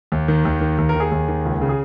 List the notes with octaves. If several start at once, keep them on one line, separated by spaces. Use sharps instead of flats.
D#2
D#3
D#2
D#3
D#2
A#4
D#3 G#4
D#2
D#3
C#2
C#3
G#4